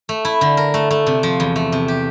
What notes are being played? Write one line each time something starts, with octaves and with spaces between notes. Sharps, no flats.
A3
E4
D3
A#4
A3
A3
C3
F3
E2
A3
C3
G4